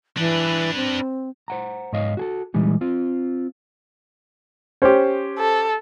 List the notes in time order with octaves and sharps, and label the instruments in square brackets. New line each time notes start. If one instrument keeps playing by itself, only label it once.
[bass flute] E3 [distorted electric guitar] D4 B4
[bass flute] C4
[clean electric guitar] C5 F#5 A#5
G#2 C#5 D#5 F5
F#4 G#4 A4
A#2 E3 G3 G#3 D#4
C4 F4
[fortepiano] C#4 G4 [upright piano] C5
[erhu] A4